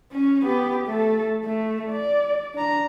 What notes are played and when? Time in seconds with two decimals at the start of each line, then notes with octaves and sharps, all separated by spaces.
0.13 C#4
0.44 B3 G4
0.87 A3 A4
1.44 A3
1.90 D5
2.54 D4 A#5